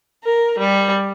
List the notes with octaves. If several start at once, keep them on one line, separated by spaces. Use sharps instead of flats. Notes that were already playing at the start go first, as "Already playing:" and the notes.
A#4
G3